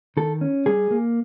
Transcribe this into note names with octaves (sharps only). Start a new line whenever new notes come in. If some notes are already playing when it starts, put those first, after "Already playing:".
D#3 A4
C#4
G3 G#4
A#3